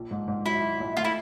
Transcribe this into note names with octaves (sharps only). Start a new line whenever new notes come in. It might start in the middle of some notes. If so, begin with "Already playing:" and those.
Already playing: A#1
G#2
G#2
F#3 E4
F#3
A#1
A3 F4
E4